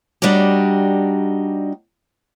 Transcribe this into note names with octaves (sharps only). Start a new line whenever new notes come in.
G3 D4 D#4 F#4 G4